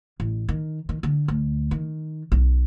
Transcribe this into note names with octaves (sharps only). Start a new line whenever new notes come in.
A1
D#3
D#3
D3
D2
D#3
B1